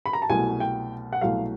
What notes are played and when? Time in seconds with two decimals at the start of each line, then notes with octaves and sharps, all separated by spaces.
0.06 B5
0.13 A#5
0.22 A5
0.30 C2 B2 F#3 A3 G#5
0.60 G5
1.13 F#5
1.21 C2 B2 F#3 A3 F5